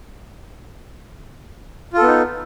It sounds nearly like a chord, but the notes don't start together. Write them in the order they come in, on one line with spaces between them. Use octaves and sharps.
F4 A4 B3 D#4